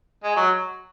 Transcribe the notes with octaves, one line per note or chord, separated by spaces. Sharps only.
G#3
F#3